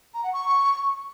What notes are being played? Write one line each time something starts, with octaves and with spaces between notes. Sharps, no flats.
A#5
F#5
C#6